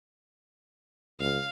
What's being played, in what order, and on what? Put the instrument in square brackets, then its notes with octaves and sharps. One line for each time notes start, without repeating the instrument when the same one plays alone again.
[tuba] C#2 [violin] F5